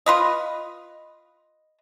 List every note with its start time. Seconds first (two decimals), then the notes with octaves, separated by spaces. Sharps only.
0.06 F4 B4 D#5